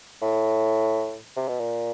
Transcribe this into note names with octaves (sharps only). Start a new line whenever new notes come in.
A2
C3
B2
A#2